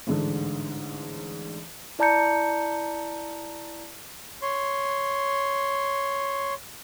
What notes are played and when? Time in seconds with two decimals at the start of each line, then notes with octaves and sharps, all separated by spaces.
0.07 A1 G#2 D3
1.99 E4 D5 A5 A#5 G6 C#7
4.42 C#5 C6